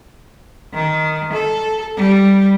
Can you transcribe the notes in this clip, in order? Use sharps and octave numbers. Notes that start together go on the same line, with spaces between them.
D#3
A4
G3